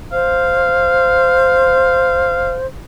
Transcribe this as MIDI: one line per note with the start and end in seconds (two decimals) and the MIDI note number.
0.12 2.66 72
0.12 2.56 77